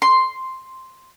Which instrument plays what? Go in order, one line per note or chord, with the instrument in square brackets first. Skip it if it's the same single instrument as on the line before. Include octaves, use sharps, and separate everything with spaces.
[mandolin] C6